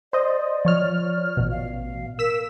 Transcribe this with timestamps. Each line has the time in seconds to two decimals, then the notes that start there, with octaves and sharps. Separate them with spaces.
0.13 C5 D5 D#5
0.65 F3 C#5 F6
1.37 A1 B2
1.51 F5
2.19 A#4 E6 B6 E7